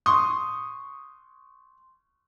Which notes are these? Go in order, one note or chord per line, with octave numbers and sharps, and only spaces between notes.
C6 C#6 D#6